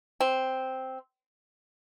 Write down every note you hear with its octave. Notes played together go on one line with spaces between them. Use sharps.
C4